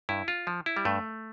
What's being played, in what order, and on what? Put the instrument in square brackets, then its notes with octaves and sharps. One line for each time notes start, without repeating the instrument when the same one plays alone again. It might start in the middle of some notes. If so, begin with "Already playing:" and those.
[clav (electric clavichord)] G2 E4
F4
F3
E4
G3
G2 A3